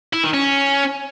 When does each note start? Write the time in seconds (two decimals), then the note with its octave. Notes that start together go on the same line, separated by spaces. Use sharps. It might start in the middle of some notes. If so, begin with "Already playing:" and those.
0.13 E4
0.23 D#3
0.34 C#4